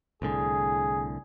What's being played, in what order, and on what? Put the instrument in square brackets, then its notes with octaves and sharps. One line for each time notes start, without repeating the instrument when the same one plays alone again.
[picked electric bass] C2 A2 D3 [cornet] G#4